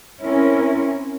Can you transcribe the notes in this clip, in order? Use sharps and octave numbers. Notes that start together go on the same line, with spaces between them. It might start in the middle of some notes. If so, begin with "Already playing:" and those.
C4 C#4 E4 A#4